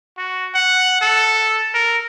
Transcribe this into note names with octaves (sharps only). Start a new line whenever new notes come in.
F#4
F#5
A4
A#4